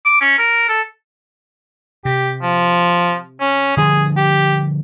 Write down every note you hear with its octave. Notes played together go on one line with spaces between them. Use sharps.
D6
C#4
A#4
A4
C3 G4
F3
C#4
D3 F3 G3 G#4
G4